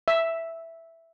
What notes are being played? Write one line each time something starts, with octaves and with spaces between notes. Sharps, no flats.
E5